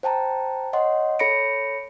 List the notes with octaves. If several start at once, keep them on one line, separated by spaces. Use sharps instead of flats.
C5 G5 A5 A#5
C#5 D#5 F#5 C6
A4 C#5 B5 A#6 C#7 D7